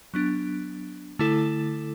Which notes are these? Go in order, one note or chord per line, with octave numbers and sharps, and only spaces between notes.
F#3 B3 D4
D3 A3 E4 A4